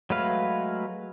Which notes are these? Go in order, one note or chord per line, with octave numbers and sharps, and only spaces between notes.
F#3 G#3 A3 B4 F5